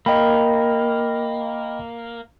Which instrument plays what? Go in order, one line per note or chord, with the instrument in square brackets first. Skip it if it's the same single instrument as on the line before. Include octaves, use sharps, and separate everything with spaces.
[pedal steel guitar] A#3 [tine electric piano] D#5 G5 B5